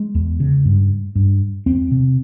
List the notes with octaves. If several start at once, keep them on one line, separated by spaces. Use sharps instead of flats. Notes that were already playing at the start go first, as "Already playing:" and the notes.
Already playing: G#3
E2
C#3
G2
G2
E2 C4
C3